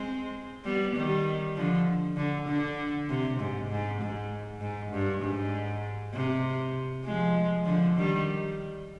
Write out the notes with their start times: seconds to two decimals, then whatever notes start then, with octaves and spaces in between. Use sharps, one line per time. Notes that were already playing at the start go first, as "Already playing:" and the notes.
Already playing: G#3 C4
0.64 G3 B3
0.95 D#3 G3
1.56 D3 F3
2.17 D3
2.48 D3
3.09 C3
3.40 G#2
3.69 G#2
4.01 G#2
4.61 G#2
4.92 G2
5.22 G#2
6.14 C3
7.05 F3 G#3
7.65 D3 F3
7.97 D#3 G3